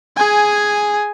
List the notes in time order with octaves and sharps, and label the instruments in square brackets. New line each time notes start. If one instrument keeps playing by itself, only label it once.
[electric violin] G#4 G#5